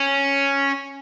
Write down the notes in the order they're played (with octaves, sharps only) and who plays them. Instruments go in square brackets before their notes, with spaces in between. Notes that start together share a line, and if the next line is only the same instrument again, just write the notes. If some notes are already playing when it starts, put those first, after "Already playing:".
Already playing: [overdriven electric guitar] C#4